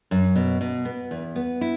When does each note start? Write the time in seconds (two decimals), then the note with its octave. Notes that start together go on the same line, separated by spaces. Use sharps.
0.11 F#2
0.36 B2
0.61 B2
0.85 B3
1.11 E2
1.36 B3
1.61 E4